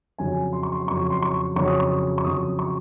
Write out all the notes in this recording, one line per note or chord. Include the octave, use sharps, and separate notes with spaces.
F2 C#3 F#3 G#5
C6
C#6
C6
F2 C#3 F#3 C#6
C6
C#6
F2 C#3 F#3 C#6
D#6
C#6
C#6
F2 C#3 F#3 D#6
C#6